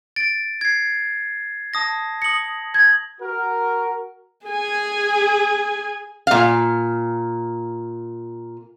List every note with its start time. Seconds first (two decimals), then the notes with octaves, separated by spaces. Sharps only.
0.16 A6 D7
0.61 G#6 C7
1.74 A5 D#6 A#6
2.22 D#6 A#6 C#7 F#7
2.74 G#6
3.20 F#4 A#4
4.46 G#4 G#5
6.27 A#2 F5